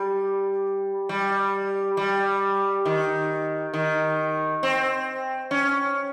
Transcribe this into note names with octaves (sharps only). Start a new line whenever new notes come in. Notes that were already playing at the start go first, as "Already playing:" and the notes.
Already playing: G3
G3
G3
D#3
D#3
C4
C#4